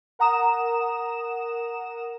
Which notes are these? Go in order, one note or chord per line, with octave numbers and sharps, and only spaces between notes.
A#4 F#5 A#5 D#6 E7